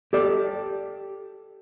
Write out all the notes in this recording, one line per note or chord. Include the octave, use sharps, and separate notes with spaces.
G4 A4 D5